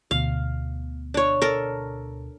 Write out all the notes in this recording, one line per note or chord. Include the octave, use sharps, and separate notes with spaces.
D2 B2 F5
D4 C#5
A4 A#4